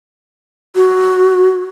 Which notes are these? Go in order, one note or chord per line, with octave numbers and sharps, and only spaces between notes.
F#4